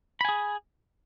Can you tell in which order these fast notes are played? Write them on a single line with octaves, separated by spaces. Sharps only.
B5 G#5 G#4